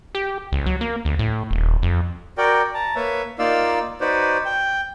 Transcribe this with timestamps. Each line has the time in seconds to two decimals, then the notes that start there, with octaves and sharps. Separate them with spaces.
0.15 G4
0.52 C#2
0.66 F#3
0.81 A#3
1.05 D2
1.19 A2
1.51 D#1
1.83 F2
2.38 F#4 A#4 D5 G5
2.74 A5 A#5
2.96 A#3 B4 C#5 E5
3.39 A#3 D#4 F4 D5 F5 E6
4.01 D#4 F#4 B4 C5 D5
4.45 G5